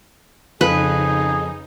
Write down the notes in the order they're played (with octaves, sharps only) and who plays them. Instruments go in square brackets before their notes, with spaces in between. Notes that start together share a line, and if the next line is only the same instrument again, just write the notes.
[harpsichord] F2 [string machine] C#3 D#4 [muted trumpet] G#4 [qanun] B4